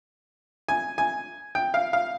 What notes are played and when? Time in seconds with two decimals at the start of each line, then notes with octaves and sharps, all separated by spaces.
0.69 G#5
0.98 G#5
1.55 G5
1.74 F5
1.93 F5